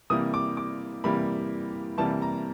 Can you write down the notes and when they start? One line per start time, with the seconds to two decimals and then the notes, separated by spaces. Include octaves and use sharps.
0.10 C3 E3 G3 A#3 D#6
0.34 D6
0.57 D6
1.04 C3 E3 G3 A#3 B5
1.98 C3 E3 G3 A#3 A5
2.22 A#5